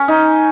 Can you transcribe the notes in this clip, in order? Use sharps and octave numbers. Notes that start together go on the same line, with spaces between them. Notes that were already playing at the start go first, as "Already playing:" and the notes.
Already playing: C#4
D#4